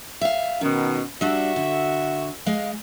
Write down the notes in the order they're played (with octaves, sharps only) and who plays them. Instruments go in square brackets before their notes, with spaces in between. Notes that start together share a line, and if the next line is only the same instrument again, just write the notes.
[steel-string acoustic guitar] E5 F5
[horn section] B2 D#3 [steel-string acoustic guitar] C#4
[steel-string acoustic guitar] G3 D4 [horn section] F#4 E5
[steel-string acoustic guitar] D3
G#3 D#5 F5